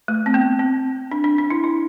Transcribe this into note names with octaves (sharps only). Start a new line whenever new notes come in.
A3
C4
B3
C4
D4
D4
D4
E4
E4